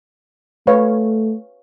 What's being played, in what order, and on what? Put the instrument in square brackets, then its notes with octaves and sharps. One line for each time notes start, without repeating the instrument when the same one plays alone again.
[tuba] A3 [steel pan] B4 C#5 F5